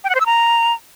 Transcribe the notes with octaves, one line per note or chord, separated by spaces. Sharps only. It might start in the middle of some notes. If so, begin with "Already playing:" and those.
G5
F#5
C5
E6
A#5